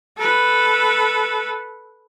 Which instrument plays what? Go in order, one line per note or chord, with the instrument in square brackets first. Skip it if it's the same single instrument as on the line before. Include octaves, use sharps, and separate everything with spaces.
[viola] A4 B4